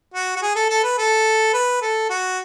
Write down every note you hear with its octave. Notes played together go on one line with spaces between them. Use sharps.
F#4
F#4
G#4
A4
A4
B4
A4
B4
A4
F#4